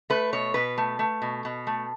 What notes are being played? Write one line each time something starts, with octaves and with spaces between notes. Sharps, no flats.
A3 B4
B2 C#5
B2 B4
A3
A3
B2
B2
A3